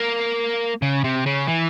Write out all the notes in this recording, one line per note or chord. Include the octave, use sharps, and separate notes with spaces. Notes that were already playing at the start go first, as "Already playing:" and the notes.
Already playing: A#3
C#3
C3
C#3
E3